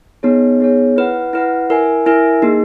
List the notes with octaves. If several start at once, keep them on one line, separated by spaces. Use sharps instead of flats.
B3 D#4 G#4 C#5
B3 D#4 G#4 C#5
E4 B4 F#5
E4 B4 F#5
E4 A#4 E5 G#5
E4 A#4 E5 G#5
A#3 D#4 G#4